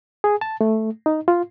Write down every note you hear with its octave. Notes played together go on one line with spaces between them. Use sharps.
G#4
A5
A3
D#4
F4